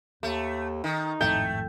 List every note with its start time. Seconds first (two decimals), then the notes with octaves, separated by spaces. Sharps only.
0.23 D#2 A3
0.84 D#3 D#4
1.21 G#1 F2 A2 A3 G5